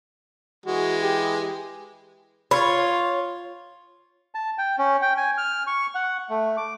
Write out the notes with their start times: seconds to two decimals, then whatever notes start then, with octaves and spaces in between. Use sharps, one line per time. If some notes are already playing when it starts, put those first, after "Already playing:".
0.66 E3 G#3 F#4
1.02 G4
2.51 F4 C#5 B5 C6
4.35 A5
4.58 G5
4.78 C#4
5.02 G5
5.17 G#5
5.38 F6
5.67 C#6
5.95 F#5
6.30 A3
6.57 D6